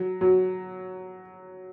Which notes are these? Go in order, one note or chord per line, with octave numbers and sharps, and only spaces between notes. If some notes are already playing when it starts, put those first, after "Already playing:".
Already playing: F#3
F#3